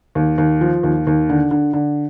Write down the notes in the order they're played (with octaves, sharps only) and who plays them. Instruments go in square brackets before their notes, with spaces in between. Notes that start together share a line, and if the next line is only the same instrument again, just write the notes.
[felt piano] D#2
D#2
F3
D#2
D#2
D3
D3
D3